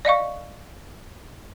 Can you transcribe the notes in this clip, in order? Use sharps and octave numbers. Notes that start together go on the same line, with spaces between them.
D5 D#5 F5 C#6